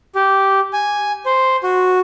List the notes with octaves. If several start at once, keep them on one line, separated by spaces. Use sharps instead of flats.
G4
G#5
C5
F#4